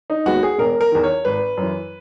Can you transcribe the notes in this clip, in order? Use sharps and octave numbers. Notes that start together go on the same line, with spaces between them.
D#4
D#2 D#3 G#3 B3 F#4
G#4
E1 A#4
A#4
E2 D#3
C#5
G#1 B4
F#2 E3